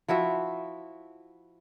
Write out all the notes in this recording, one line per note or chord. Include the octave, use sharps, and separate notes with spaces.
F3 E4 F#4 E5